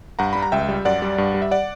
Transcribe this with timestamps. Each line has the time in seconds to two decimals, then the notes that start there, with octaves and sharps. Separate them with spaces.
0.19 G2 F#5 A#5
0.33 G3 B5
0.42 A#5
0.52 C#2 E5 G5
0.68 G3
0.85 F#2 D5 F#5
1.02 G3
1.18 G2
1.34 G3
1.42 E5
1.51 D5 F#5